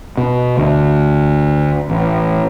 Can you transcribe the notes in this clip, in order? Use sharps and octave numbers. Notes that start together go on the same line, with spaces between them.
B2
D2
A1